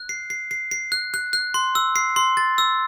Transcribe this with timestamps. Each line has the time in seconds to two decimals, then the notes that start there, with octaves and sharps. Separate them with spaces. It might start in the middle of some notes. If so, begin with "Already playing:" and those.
Already playing: F#6
0.09 C7
0.30 C7
0.51 C7
0.71 C7
0.92 F#6
1.14 F#6
1.33 F#6
1.54 C6
1.75 E6
1.96 C7
2.16 C6
2.37 A6
2.58 E6